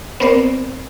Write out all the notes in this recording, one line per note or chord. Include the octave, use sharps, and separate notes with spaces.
B3 C4 A#4 C5 D5